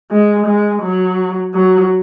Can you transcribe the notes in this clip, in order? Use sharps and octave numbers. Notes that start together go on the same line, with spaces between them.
G#3
G#3
F#3
F#3